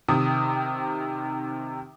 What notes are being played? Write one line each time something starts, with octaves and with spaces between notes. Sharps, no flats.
C3 D#3 D#6